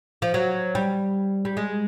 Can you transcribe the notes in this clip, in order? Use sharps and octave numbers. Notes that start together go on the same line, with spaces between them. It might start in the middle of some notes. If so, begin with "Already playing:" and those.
F3
F#3
G3
G3
G#3